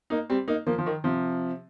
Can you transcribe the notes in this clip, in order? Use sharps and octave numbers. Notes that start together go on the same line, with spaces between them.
A#3 D#4
G3 C4
A#3 D#4
F3 A#3
F3
D#3
C3 F3